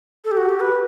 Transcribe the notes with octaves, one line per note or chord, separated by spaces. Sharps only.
A4
G4
F#4
G4
B4